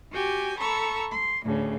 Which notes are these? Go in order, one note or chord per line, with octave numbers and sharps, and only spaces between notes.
F#4 G4 G5 G#5
A4 A#5 B5 C#6 E6
C6
D2 A2 C#3